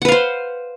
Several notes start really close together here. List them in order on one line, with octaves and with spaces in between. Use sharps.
F#5 B4 F5 C5